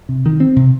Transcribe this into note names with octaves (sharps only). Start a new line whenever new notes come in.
C3
D#3
C4
C3